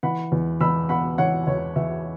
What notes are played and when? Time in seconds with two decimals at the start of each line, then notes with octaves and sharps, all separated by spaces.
0.03 E3 F#5 B5
0.32 E2
0.61 E2 B5 E6
0.89 B3 F#5 B5
1.18 E3 C#5 F#5
1.47 E2 C#5
1.76 E2 E5